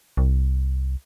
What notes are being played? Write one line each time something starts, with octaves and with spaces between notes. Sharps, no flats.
C2